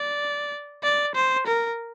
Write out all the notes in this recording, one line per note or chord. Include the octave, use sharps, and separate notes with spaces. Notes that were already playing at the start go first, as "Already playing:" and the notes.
Already playing: D5
D5
C5
A#4